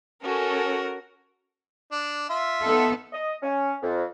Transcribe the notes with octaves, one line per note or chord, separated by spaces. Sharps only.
C#4 F#4 A4 A#4
D4
F4 E5
B3 D#4 A4
D#5
C#4
F2